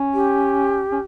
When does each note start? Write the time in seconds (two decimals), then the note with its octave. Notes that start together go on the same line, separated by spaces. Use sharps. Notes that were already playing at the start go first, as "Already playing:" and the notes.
Already playing: C#4
0.14 G4
0.92 C#4